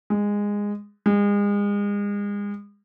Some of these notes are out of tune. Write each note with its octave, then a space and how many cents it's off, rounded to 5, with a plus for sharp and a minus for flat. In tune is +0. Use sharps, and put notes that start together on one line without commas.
G#3 -15
G#3 -35